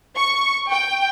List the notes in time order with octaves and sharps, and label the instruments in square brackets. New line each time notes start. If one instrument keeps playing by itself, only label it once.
[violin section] C#6
G5